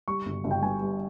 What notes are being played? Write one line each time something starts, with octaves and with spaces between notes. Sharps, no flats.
G3 C#6
G1
G1
G5
G2 G#5
G3